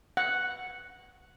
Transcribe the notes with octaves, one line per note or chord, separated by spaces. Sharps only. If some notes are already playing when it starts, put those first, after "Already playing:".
F#5